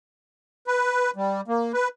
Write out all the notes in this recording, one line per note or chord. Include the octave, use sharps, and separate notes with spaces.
B4
G3
A#3
B4